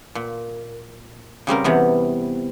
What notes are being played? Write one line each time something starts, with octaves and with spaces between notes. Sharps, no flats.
A#2
C#3 G3 C4 A#4
E2 C3 B3